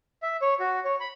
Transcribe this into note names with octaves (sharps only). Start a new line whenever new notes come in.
E5
C#5
F#4
C#5
B5